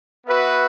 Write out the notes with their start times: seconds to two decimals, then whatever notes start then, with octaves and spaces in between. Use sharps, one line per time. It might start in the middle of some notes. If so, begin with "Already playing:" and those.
0.24 B3 F#4 B4 E5